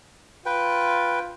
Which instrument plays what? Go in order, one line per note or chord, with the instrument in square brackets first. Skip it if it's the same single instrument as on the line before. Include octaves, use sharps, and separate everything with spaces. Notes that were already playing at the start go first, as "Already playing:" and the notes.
[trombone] F4 [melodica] B4 G5